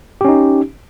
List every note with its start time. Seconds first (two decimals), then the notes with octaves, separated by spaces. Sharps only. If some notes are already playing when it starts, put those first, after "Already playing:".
0.21 G4
0.25 C#4
0.28 D#4